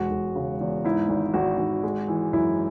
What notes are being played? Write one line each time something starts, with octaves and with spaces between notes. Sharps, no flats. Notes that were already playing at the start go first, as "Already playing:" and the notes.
Already playing: E1 G#3 F#4
E1
C#3
E2
G#2 E4
G#1
G#1 F#4
G#1
G#3
E3
F#2 E4